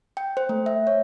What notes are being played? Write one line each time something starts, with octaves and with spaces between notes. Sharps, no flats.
G5
C5
A3
E5
C#5